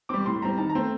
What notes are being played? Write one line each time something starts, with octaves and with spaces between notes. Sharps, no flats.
G3 C4 D6
A2 C6
G3 C4 A#5
D#3 A5
A#5
A3 C4